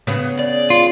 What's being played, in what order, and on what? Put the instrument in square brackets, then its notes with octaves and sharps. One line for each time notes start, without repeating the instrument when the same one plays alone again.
[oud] C#3 B3
[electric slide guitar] D5
[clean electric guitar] F4